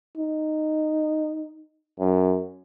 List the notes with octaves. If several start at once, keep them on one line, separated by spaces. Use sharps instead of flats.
D#4
F#2